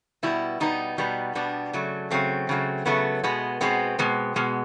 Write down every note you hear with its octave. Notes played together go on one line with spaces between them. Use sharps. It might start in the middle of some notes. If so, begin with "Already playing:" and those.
B2 G3 B3 E4
B2 G3 B3 D#4
B2 G3 B3
B2 G3 B3 D4
C#3 F#3 A3
C#3 F#3 A3 C4
C#3 F#3 A3
C#3 F#3 A3 B3
B2 G#3 B3
B2 G#3 B3 C4
B2 G#3 B3
B2 G#3 B3